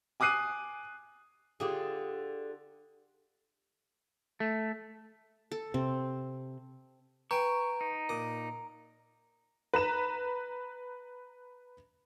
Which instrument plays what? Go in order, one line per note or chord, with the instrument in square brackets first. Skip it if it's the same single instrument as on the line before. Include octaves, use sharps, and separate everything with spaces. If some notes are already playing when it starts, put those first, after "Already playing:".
[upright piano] G#5 D6 D#6 F#6 C7 D#7
[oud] D3 G#4 [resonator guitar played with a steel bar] F4 G4
[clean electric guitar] A3
[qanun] A4
[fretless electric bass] C3 [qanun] C4
[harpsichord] B4 G5 G#5 [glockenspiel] A#5 D7 [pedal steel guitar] C#6
[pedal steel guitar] D#4
[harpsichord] A#2 D6 D#6
[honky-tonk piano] B4 A#5 E7